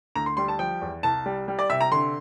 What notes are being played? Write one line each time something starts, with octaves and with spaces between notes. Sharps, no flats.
D2 A#5
C6
G3 C6
A5
F3 G5
E2
C2 A5
G3
G3
D5
C3 E5
A#5
D3 C6